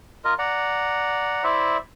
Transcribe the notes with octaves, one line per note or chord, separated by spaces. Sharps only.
F4 A#4 D#5
D5 F#5 A#5
E4 C5 D5 E5